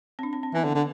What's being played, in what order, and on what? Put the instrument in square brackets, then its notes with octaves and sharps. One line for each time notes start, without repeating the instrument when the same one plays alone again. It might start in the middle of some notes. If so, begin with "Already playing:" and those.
[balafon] C4
D4
C4
C4
[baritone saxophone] E3 [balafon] B3
[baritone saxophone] D3
D3